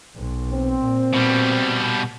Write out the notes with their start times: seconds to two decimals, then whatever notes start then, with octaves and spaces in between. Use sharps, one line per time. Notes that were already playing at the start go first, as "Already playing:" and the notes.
0.16 B1
0.52 C4
0.83 A#2
1.13 B2 G3